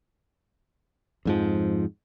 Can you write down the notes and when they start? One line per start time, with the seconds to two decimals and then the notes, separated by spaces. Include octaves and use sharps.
1.25 F2 G#2 F3